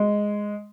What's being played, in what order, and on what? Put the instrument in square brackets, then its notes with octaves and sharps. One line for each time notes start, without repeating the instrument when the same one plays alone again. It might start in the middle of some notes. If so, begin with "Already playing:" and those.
Already playing: [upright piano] G#3